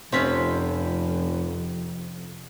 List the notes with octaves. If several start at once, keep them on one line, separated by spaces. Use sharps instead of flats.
F1 F2 C3 C4 C#4 C5 B5